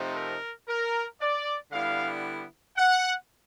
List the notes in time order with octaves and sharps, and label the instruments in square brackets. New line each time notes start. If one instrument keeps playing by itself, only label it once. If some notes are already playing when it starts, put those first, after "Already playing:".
Already playing: [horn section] C3 F3 A3 C4 D#4
A#4
A#4
D5
D3 G3 B3 E4 F5
F#5